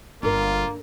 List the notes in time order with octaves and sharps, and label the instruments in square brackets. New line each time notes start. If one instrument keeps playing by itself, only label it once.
[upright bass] G1 [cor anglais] A#3 [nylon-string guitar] D4 A4 A#4 [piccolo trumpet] F4